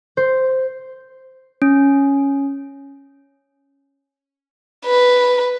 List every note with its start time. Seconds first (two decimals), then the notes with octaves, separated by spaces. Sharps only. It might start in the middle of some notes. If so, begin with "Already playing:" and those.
0.17 C5
1.62 C#4
4.86 B4